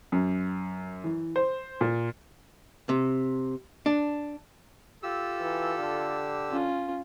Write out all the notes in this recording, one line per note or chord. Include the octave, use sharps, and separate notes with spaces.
F#2
E3
C5
A#2
C3
D4
F4 G4 A4 E6
E3
D3
C#4 F4